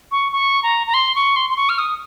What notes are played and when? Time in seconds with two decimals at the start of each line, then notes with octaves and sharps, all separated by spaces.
0.12 C#6
0.32 C#6
0.63 A#5
0.87 A#5
0.94 C6
1.15 C#6
1.36 C6
1.50 C6
1.57 C#6
1.69 F6
1.78 D#6